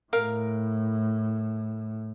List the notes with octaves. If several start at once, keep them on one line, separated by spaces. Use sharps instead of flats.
A2 A#4 F5